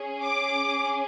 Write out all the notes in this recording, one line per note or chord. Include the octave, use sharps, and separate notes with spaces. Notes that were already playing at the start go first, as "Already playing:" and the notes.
Already playing: C#4 G#4
D6